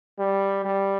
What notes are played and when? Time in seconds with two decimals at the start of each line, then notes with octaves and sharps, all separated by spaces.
0.19 G3
0.65 G3